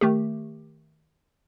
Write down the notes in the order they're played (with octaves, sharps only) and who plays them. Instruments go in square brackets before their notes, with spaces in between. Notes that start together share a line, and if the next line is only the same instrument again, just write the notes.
[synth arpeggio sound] D#3 A3 G4